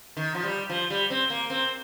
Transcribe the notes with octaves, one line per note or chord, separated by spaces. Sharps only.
D#3
F3
G3
F3
G3
C4
A#3
C4